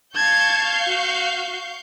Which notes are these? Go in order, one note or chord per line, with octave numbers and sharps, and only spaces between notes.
F5 A5 C#6 G6 G#6
F#4